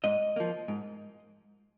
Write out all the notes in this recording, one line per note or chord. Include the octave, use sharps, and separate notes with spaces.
G#2 D#5
F3 A#3
G#2